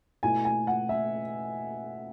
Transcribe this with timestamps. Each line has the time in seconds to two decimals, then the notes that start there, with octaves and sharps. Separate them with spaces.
0.23 B2 A3 E4 G#5
0.45 G#5
0.67 F#5
0.89 E5